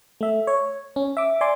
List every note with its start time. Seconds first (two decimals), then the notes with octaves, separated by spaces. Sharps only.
0.21 A3 E5
0.47 C#5
0.96 C#4
1.17 E5 D6
1.41 D5 G#5 C6 D6